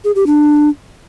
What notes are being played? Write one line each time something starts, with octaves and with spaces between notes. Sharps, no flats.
G#4
G4
D4